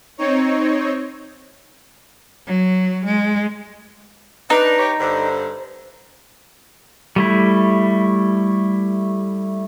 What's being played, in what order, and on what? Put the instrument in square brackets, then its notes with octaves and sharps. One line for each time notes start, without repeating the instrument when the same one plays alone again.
[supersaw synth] C4 D#4 C#5
[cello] F#3
G#3
[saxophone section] D4 [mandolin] D#4 [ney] B4
[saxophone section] G4 C#5
[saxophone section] G2 D3 [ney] C5
[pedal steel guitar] G3 A3 E4